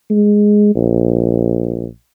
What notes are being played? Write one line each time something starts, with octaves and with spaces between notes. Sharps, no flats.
G#3
A#1